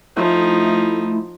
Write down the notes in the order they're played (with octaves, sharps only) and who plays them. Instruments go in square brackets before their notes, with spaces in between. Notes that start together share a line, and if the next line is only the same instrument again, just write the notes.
[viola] F3 D#4 [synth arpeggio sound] A3 E4